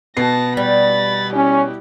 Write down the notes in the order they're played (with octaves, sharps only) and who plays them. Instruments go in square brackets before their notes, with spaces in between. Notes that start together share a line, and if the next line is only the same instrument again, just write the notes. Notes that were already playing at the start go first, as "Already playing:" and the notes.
[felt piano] B2 B3 C7 [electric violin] A5 A#6
[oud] G3 [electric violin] B5 A6
[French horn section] C#4 [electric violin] E4 G4